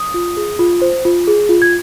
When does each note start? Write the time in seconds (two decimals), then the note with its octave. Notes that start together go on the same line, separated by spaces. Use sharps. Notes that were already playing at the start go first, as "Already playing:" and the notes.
Already playing: D#6
0.14 F4
0.37 G#4
0.59 F4
0.82 C5
1.05 F4
1.27 G#4
1.49 F4
1.62 G#6